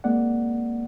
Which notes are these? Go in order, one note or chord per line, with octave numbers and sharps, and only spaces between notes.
G#3 A#3 C4 D5 F#5